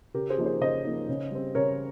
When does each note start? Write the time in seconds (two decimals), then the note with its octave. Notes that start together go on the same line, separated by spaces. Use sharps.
0.14 C#3 G4 A#4
0.30 G#4 C5
0.38 F3 A#3 D#4
0.46 G#4 C5
0.61 C#3 C5 D#5
0.85 F3 A#3 D#4
1.09 C#3
1.31 G3 C4
1.55 C#3 A#4 C#5